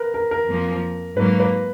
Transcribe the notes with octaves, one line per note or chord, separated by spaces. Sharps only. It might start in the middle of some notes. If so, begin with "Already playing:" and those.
Already playing: A#4 B4
A#4
A#4
F2 F3 A#3
G#2 F#3 A#3 B4
B4